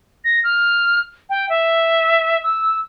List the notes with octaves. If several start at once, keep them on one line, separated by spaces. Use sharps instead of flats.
A#6
F6
G5
E5
E6